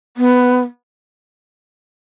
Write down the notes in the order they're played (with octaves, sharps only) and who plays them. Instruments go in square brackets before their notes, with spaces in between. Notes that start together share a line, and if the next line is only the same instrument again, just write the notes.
[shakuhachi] B3